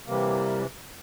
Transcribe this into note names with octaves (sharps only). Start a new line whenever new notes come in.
C3 E3 G3 A#3